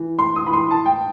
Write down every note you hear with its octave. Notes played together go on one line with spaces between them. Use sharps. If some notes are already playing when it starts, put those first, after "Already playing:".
Already playing: E3
A2 C6
D#6
E3 B5
C6
A2 A5
G5